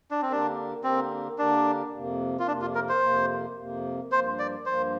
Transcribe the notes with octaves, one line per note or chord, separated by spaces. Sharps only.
D4
C4
D3 A#3 D4 G4 A#4
D3 A#3 C4 G4 A#4
D3 A#3 D4 G4 A#4
F2 C3 A#3
F4
F2 C3 A#3 D4
F4
A#4
C5
F2 C3 A#3
F2 C3 A#3
G2 F3 A#3 C5
D5
G2 F3 A#3 C5